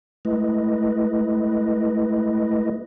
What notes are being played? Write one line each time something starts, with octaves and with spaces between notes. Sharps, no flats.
G#3 A3 E4 B4 D#5